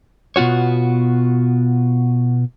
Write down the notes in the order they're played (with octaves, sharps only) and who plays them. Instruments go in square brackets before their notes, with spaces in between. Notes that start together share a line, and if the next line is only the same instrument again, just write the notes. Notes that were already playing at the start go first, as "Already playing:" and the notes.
[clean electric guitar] B2 B3 F4 F#4 C#5